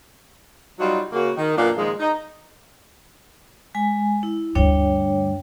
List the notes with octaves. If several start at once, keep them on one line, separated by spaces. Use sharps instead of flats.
F#3 G3 D#4 F4 F#4
C#3 A#3 F#4
D#3
F#2 A#2 B3 D4 A#4 F5
A#2 D#3 F3 G#3
D#4
G#3 G#5
E4
D2 G2 D4 C#5 G5